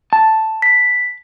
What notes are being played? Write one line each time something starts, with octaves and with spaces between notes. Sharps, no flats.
A5
B6